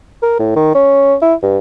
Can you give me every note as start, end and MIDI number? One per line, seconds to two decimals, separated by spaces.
0.23 0.35 70
0.39 0.53 45
0.56 0.71 51
0.75 1.15 61
1.22 1.34 64
1.42 1.58 43